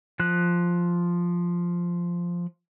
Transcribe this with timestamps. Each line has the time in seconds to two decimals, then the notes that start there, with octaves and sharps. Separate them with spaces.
0.20 F3 F#6